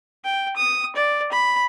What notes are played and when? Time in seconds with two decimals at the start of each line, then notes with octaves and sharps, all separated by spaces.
0.24 G5
0.57 D#6
0.96 D5
1.32 B5